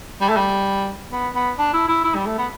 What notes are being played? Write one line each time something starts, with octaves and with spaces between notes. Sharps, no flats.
G3
A3
G3
B3
B3
D4
E4
E4
E4
G3
A3
B3